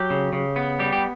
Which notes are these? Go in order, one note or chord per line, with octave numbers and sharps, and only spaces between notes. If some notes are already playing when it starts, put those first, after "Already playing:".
Already playing: F#3 G4
C#3
C#3
B3
G3 G4
G4